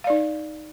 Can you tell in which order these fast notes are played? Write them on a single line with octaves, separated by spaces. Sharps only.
F5 D5 D#4